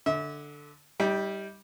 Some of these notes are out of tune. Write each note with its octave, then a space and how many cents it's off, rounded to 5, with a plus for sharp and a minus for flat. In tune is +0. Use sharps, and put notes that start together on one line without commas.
D3 +0 E5 -35
G3 +0 D#4 +40 G5 +0